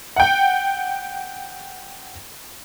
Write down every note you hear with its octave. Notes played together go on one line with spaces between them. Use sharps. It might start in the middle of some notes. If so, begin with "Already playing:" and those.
F#5 G5